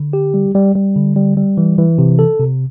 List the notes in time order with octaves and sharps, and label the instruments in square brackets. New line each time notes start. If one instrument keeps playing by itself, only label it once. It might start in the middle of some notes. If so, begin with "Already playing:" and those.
Already playing: [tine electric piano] D3
G4
G3
G3
G3
D3
G3
G3
E3
E3
C3
A4
C3